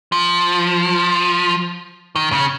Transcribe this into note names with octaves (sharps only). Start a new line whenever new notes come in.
F3
D#3
C#3